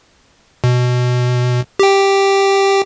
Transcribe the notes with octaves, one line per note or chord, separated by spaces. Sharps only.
B2
G4 G5